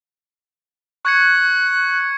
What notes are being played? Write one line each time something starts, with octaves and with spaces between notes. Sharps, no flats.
C#6 F#6 G#6 C#7